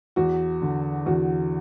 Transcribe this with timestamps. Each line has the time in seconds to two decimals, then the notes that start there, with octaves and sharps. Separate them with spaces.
0.16 E2 F#4
0.62 D3
1.06 E2 F#4